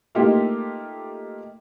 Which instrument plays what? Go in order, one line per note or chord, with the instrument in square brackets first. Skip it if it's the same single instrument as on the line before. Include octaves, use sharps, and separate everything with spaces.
[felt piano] A3 A#3 D#4 F4 G4